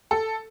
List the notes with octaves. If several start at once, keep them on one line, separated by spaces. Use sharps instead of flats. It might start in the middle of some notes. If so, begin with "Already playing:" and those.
A4